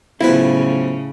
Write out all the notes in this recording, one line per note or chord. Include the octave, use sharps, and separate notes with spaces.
B1 A2 C#3 F3 E4 B4